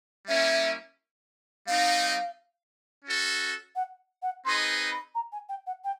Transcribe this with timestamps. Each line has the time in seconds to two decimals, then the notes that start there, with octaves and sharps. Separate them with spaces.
0.27 G3 A#3 C#4 E4 E5
1.66 G3 C4 D#4 F5
3.05 C#4 F#4 A4
3.75 F#5
4.22 F#5
4.45 C4 D#4 G#4 B4 D#5 C6
4.91 B5
5.14 A#5
5.32 G#5
5.48 G5
5.66 F#5
5.84 G5